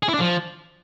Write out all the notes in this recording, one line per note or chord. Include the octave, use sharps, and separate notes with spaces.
G#4
E4
D4
F3